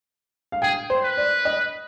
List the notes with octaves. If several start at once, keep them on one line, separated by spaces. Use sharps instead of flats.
F5
G#4 G5
C5
B4
D5
D#5